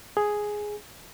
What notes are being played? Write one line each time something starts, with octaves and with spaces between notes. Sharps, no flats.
G#4